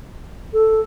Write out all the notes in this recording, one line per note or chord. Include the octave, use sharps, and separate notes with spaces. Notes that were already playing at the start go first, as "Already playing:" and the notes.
A4